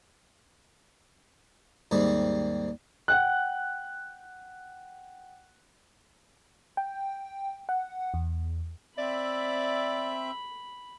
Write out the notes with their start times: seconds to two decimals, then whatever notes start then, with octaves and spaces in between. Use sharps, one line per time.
1.91 D#2 G#2 G3 C4
3.08 F#5 G5 F#6
6.77 G5
7.69 F#5
8.14 E2
8.98 C4 D5 E5 B5